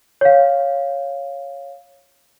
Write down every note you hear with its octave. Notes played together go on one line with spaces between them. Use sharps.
C#5 F5